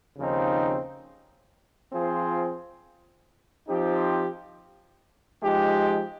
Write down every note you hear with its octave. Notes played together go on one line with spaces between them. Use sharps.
D#2 C#3 F3 C4 D#4
F3 C4 F4 G#4 C5
F3 C4 D#4 G4
F3 G#3 D#4 G4